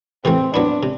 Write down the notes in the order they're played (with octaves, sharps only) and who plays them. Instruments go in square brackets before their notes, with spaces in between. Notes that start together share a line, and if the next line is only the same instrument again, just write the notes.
[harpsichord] C3 E3 A3 [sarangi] C4
[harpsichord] F#3 B3 E4 [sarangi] D4
[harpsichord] C3